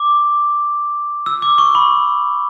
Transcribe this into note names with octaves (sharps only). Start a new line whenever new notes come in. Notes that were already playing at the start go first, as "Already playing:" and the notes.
Already playing: D6
E6
D6
C#6
B5